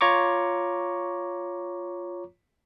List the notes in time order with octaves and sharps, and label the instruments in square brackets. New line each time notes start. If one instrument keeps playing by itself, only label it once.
[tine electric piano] F4 C#5 A#5 C#6 D6